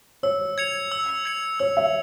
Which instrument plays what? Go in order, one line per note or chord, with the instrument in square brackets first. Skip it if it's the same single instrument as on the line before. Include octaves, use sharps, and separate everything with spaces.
[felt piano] C#5 [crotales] E6
[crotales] G#6 C#7 F7
E6
G#6 C#7 F7
[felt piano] C#5 [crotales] E6
[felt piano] E5